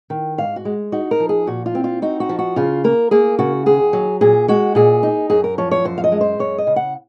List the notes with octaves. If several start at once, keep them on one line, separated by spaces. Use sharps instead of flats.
D#3
G#2 F5
F#4
G#3
D#4 F#4
A#4
F3
G#4
A#2 F#4
F4
C4
F4
D#4 F#4
F#4
F3
F#4
C#3 F4
A#3 A#4
A#3 G#4
C#3 F#4
D#2 G#4
F#3
A#2 G#4
G#3 F#4
A#2 G#4
D#4
F#2 G#4
A#4
F3 C#5
C#5
F#2 C5
F5
D#5
G#3
C5
F#2 C#5
D#5
C#3
F#5